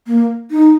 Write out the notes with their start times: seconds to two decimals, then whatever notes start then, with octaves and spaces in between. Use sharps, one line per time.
0.07 A#3
0.51 D#4